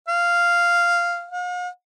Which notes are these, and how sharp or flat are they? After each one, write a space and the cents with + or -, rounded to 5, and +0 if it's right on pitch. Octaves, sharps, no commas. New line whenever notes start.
F5 -5
F5 +45